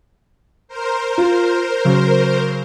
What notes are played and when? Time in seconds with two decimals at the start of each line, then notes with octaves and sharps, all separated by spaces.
0.68 A#4 C5
1.18 F4
1.85 C#3 F#3